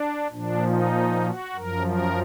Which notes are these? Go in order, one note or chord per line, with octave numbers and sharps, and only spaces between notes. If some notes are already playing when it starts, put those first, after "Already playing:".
Already playing: D4
A#2 F3 D4
D#4
F#4
F#2 F3 A#4
A#4